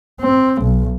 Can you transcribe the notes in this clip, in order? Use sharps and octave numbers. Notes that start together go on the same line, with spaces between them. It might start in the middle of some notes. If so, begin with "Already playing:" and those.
C4
B1